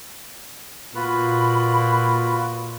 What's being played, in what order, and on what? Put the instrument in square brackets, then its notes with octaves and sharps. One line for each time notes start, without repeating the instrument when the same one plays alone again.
[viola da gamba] A#2 [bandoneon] F4 F#4 B4 [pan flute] B5